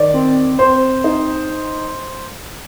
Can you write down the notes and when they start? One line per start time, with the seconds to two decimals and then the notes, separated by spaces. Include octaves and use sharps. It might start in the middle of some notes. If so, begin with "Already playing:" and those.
Already playing: D#3 D5
0.14 C4
0.58 C4 C5
1.04 D#4